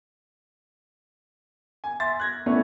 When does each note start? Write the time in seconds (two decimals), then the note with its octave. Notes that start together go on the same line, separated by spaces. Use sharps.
1.84 G#5
2.00 E5 C6 A6
2.20 F#6 G#6 A#6
2.46 A3 B3 C#4 D4 E4